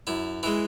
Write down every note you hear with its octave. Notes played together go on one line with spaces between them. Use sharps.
F#2 E4
E3 G#3 E4